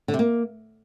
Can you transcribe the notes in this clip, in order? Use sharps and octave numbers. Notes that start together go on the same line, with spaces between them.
D3
C3
A#3